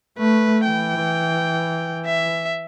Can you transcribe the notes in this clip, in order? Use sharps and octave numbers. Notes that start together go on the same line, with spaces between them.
A3 B4
E3 G5
E5